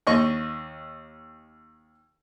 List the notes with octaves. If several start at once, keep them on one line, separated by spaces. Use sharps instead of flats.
D#2 D#5 C#6